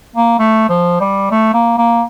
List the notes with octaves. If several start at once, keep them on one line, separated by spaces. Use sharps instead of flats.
A#3
A3
F3
G3
A3
A#3
A#3